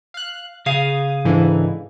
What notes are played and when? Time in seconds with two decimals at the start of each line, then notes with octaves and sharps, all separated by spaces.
0.14 F5 F#6
0.66 C#3 G#4 F5 D#6
1.25 G#2 D3 E3